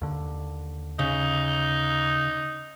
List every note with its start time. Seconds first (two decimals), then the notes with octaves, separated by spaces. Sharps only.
0.02 D#2 D3
0.99 C#3 D#4